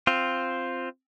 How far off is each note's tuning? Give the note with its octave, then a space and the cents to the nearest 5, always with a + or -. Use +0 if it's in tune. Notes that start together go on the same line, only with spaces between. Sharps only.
C4 +0 F4 +0